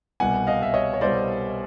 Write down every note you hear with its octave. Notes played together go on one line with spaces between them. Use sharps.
C2 B2 G3 F#5 G#5
D#5 F5
E5
C#5 D#5
C#5
C2 B2 G3 C5 D5